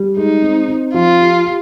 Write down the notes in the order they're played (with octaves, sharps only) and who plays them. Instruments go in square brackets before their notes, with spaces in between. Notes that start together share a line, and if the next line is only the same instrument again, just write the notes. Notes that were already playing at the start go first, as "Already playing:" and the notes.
Already playing: [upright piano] G3
[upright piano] G#3 [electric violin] D#4
[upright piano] C4
C4
[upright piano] F3 [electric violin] F4
[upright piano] G4
G4